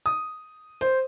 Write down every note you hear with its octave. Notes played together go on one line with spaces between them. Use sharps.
D#6
C5